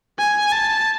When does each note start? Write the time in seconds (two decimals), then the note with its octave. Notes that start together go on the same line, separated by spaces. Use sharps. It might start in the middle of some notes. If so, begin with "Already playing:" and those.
0.18 G#5
0.52 A5